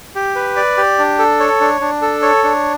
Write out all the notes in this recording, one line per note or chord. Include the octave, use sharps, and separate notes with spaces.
G4
B4
D5
G4
D4
A4
C#5
D4
D4
A4
C#5
D4